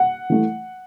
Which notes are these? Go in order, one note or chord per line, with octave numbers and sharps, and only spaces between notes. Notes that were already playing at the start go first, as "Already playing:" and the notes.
Already playing: F#5
E3 A3